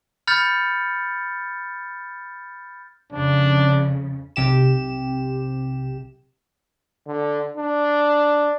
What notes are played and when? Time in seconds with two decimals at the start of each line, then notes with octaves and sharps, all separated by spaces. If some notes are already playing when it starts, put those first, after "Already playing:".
0.27 B5 F6 G6 A6 C#7
3.12 F2 C#3 D4
4.36 B1 C3 G4 E7
7.07 D3
7.57 D4